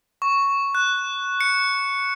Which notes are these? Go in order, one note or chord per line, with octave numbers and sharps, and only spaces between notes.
C#6
F#6
C#7